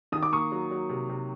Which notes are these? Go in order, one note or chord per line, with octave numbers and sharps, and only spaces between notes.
D#3 D#6
D6
A#3 C#6 D#6
F#3
F#3
C3
C3